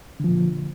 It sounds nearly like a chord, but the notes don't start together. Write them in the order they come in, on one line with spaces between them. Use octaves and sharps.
D3 F3 A#2